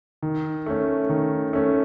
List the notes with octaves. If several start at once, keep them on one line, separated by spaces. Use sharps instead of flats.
D#3
A3 C#4
D#3
A3 C#4